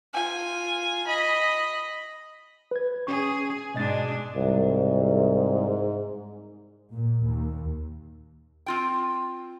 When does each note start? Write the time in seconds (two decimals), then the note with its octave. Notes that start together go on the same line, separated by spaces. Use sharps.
0.13 F4 G#5
1.07 D#5 B5
2.71 B4 G#6
3.07 C#4 G#4 C#6
3.74 G#2 B2 G#3 D4 D#5 A6
4.36 C2 G#2
6.94 A#2
7.24 D#2
8.66 C4 F4 G5